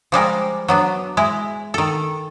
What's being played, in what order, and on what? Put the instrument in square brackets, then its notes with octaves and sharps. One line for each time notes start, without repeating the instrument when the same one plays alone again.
[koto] F3 G3 G#3 A#4
F#3 B3 D4
G#3 E4
D#3 A4